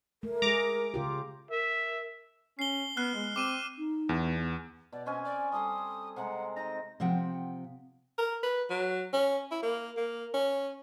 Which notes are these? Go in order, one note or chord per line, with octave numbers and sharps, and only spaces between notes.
A3 A#4
G#3 G#4 A#5 D6
C#3 F4 G4
A#4 E5
C#4 C7 G7
B3 F6 F#6 C7
G#3
C4 D6 D#7 E7
D#4
E2
B3
B2 D5
C4 C#4 D#5 G#5
D5
G3 A4 C6 D#6
C3 G#3 F#5 A#5
D#4 D#5 A#6
C3 F3 C4 F#5 G5
A#4
B4
F#3
C#4
E4
A#3
A#3
C#4